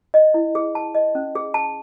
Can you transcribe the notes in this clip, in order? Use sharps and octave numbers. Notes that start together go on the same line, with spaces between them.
D#5
E4
G#4
A5
D#5
C#4
G#4
A5